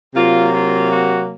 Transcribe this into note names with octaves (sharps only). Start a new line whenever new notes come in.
C3 F#3 A#3 F4
F4
F#4